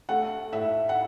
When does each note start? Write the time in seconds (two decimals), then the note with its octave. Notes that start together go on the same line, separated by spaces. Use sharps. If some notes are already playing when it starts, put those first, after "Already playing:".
0.09 A3 F#5
0.52 A2 E5
0.89 F#5